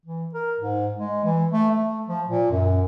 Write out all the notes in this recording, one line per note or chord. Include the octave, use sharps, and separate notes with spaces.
E3
A#4
G#2
G#3
E3
A3
A3
F3
A#2
F#2